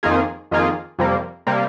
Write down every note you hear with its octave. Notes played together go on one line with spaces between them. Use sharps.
F2 D#3 A#3 F4 G#4
F2 D#3 A#3 F4 G#4
F2 C3 G3 A#3
C3 G3 A#3